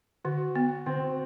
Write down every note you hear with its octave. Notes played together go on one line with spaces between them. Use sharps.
D3 F#4
B3
D3 C4